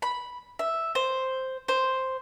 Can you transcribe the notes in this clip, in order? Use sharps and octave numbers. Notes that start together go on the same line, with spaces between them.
B5
E5
C5
C5